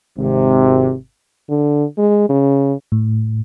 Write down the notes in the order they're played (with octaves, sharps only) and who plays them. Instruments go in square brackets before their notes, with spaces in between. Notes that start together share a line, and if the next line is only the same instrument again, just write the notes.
[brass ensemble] G#1 C3
[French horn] D3
G#3
C#3
[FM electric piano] A2